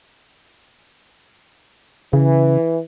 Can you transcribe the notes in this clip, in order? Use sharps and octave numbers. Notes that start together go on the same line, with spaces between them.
C#3 E3